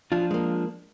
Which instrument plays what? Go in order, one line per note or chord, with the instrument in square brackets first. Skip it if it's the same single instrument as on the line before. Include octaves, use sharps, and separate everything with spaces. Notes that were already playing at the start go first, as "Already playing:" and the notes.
[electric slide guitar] F3 D4 [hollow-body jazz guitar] F4
[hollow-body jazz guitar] G#3 A#3